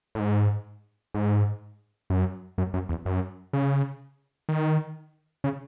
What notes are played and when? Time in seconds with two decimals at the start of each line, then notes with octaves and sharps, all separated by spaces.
0.15 A2
0.19 G#2
1.14 G#2
2.10 F#2
2.58 F#2
2.74 F#2
2.89 E2
3.05 F#2
3.53 C#3
4.49 D#3
5.44 C#3